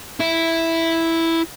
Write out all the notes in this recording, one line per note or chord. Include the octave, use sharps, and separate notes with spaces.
E4